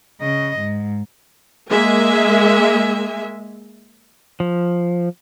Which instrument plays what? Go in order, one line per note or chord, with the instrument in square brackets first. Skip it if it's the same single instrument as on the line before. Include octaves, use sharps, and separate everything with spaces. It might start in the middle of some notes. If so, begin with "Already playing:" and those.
[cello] C#3 D#5
G#2
[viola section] G#3 A#3 E5 G#5
[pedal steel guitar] F3